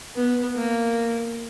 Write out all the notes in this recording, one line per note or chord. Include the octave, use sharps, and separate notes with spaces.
B3
A#3